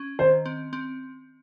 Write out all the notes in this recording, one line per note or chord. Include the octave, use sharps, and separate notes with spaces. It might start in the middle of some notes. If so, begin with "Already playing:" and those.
Already playing: C#4
D#3 C5
C4
C4